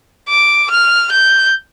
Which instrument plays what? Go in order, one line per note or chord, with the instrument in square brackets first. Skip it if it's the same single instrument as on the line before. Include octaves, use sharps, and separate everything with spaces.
[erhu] D6
F6
G6